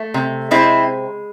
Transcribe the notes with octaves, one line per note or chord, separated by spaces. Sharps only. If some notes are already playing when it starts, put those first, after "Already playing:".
Already playing: A3
C3
G#3 C4 E4